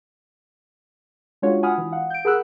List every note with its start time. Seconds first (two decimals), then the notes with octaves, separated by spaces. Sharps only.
1.42 G#3 C#4 D4 F4 F#4 C#5
1.63 F#5 G#5 B5 D#6 F6
1.78 E3
1.92 F5 F#5
2.10 G6 D7
2.25 G#4 A#4 F#5 B5 E6 F#6